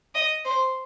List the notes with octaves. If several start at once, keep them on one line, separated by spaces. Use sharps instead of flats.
D#5
C5